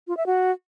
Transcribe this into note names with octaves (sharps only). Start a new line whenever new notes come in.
F4
E5
F#4